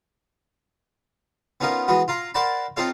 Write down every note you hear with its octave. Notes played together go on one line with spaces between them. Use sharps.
B3 C#4 D#4 F4 A#4
E3 G#3 B3 F#4
F4 F5 A#5
A#4 C5 D5 F#5 A5 B5
C4 D#4 F4 A4 C#5 F5